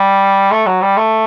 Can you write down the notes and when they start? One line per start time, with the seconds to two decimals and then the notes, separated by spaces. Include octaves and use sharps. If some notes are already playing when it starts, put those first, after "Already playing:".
Already playing: G3
0.52 A3
0.67 F#3
0.82 G3
0.97 A3